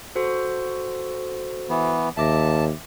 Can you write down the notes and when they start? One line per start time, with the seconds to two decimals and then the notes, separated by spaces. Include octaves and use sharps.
0.16 F#4 A4 C5
1.69 E3 B3
2.17 D#2 E5 A5 D6 A#6